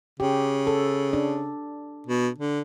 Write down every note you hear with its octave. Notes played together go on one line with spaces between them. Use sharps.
C#3 G4
A4
D4
B2
D3